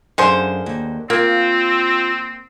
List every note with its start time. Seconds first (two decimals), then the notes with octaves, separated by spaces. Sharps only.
0.18 F#2 D3 G#4 C5 F5
0.66 D#2
1.10 A#3 C4 F4